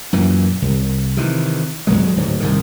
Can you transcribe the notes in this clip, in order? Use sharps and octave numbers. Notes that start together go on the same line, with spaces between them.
F#2 A#2 E3
C2
C3 D#3 E3
D#1 G2 F#3 G#3
D1 G#2
C2 G#2 D#3